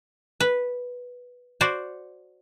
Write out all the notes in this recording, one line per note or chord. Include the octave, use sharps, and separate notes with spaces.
B4
F#4 C5 D5